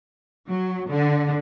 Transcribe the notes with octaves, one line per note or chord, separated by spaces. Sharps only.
F#3
D3